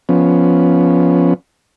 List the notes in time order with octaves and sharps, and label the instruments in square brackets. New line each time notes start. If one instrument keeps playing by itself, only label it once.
[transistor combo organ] F3 B3 C#4